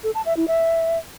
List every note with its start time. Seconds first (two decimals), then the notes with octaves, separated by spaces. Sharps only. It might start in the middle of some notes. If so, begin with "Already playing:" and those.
0.04 A4
0.15 A5
0.26 E5
0.37 E4
0.48 E5